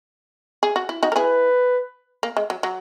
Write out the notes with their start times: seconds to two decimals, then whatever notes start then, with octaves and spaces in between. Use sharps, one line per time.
0.63 G#4
0.76 F#4
0.89 E4
1.03 D#4 F#4
1.12 A#4
1.16 E4 G#4 B4
2.23 A#3
2.37 G#3
2.50 F#3
2.63 F#3